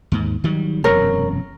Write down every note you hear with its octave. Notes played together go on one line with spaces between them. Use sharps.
D#2 G#2
D#3 F#3 G3
E1 F#2 C3 A#4 C#5